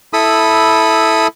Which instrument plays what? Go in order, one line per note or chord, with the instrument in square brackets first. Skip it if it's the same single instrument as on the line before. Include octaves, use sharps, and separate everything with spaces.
[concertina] E4 A4 B5 D#6